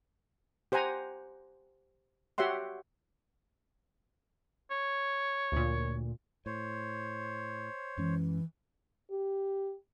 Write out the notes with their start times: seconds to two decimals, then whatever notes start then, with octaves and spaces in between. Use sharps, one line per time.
0.72 G4 C5 F#5 G#5 A#5
2.38 F#4 G4 C#5 E5 F#5 C6
4.71 C#5
5.52 D2 A#2
6.46 A2 C5 C#5
7.98 F#2 E3 G#3 C#4
9.11 G4